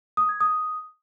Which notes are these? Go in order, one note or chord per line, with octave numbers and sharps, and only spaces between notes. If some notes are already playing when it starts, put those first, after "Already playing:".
D#6
G#6
D#6